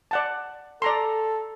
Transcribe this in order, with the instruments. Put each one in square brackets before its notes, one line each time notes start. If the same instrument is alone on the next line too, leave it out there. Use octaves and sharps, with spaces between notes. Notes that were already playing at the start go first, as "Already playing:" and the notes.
[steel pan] D5 F#5 A5
[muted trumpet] A4 [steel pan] D5 A#5 C6